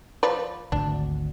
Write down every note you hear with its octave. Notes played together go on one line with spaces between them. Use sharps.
F3 B4 D5
G#1 D2 D4